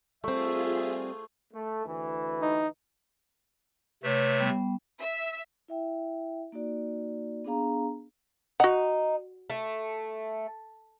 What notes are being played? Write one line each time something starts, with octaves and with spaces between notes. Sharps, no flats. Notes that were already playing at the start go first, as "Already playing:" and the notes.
G3 A3 C4 F4 G#4 C5 E5
A3
D2 E3
D#4
C3 A3 B4 C#5
G3 B3
E5
E4 E5 G5
A#3 D#4 F#4 D5
B3 D4 G#4 F5 A#5
D#4 F#4 F#5
A3